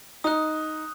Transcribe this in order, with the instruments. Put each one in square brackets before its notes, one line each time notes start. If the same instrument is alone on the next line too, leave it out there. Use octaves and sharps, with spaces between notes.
[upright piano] D#4 [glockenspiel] D#6 F#6